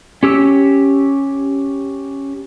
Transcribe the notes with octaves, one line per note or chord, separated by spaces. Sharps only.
C#4 G4 E6